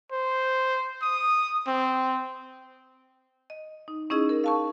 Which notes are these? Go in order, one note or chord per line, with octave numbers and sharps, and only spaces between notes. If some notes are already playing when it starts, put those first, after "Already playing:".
C5
D#6
C4
D#5
D#4
C#4 D#4 E4 G#4 D#5
A#4
F5 A5 C#6